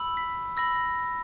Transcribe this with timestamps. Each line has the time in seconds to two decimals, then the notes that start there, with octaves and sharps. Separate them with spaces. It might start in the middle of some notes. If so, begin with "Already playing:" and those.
Already playing: B5 E6
0.17 B6
0.57 B5 E6 A#6